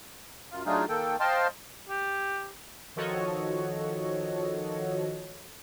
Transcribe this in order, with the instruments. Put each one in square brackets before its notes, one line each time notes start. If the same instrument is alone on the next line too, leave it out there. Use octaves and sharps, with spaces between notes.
[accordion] F#2 F4
F#3 A3 D4 D#4 F4 G#4
D#3 A#3 A4 G5
C5 D#5 F5 G5 A5 C6
[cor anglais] G4
[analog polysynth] D#3 F3 F#4 A4 C#5 D#5